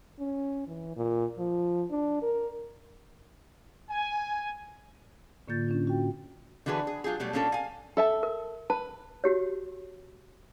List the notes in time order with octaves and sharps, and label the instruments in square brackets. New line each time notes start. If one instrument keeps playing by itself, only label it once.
[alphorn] C#4
E3
A#2
F3
D4
A#4
[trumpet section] G#5
[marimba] A2 D3 A#3 F4 G6 A6
C#4 D4 F4
A2 F#4 G5
[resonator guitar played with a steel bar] D3 E3 F#4 G#4 B4
G#4
F#3 F4 G4 G#4
B2 F#3 G3 A3
A#2 A#3 C#4 D4 A4
F5 G#5
[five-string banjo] A4 E5 A5
[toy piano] A#4
[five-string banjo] B4 [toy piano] A5
[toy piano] F#4 G4 C#5